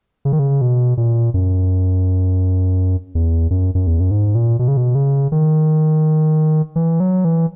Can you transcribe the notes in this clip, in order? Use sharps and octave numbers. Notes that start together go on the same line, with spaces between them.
C#3
D#3
C#3
B2
A#2
F#2
E2
F#2
F#2
E2
F#2
G#2
A#2
B2
C#3
B2
C#3
D#3
E3
F#3
E3